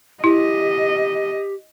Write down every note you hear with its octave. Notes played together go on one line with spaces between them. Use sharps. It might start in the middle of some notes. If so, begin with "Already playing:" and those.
E4 G4 D#5